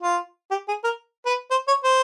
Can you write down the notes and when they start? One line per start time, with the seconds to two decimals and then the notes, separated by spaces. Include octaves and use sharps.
0.02 F4
0.51 G4
0.68 G#4
0.84 A#4
1.26 B4
1.50 C5
1.68 C#5
1.84 C5